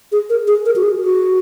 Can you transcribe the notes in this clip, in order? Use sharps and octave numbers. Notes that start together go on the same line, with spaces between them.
G#4
A#4
G#4
A#4
F#4
G#4
F#4